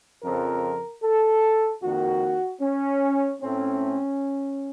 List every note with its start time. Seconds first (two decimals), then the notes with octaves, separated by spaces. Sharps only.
0.24 F2 C#3 F3 C4 A#4
1.03 A4
1.81 F2 D#3 A#3 F#4
2.61 C#4
3.40 A2 A3 C4 C#4